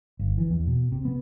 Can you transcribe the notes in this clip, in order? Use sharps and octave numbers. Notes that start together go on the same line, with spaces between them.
G1
E3
E2
B2
C3
B3